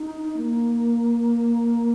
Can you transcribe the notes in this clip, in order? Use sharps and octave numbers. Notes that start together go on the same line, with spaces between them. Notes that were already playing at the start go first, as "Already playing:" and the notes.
Already playing: D#4
A#3